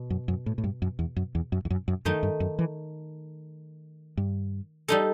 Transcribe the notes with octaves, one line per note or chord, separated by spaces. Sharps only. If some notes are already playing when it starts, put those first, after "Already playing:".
Already playing: B2
F#2
F#2
A2
A2
G2
F#2
E2
F#2
E2
F#2
E2
F#2
F#2
F#2 D#3 A3 D#4
G2
F#2
E3
G2
G3 D#4 A4